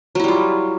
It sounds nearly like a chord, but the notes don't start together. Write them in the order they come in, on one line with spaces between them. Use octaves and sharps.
F#3 E4 G3 F4